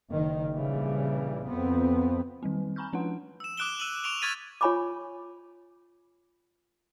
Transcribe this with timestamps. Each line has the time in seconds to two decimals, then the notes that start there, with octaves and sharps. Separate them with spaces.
0.10 F#1 D#3
0.51 A#1 C#3 E3 G3
1.44 F2 B3 C4
2.43 D#3 G3 C4
2.76 G#5 A#5 B5 C#6 F6 G6
2.93 F3 C#4 D4 B4 F#5 C6
3.40 E6 E7
3.57 D6 D#6 F#6 D7 E7 G7
3.80 E6 D#7 E7 F#7
4.04 C#6 D7 E7 F7 G7
4.22 C#6 F6 G#6 A6 B6 D#7
4.61 F4 C#5 G#5 B5 C#6 D6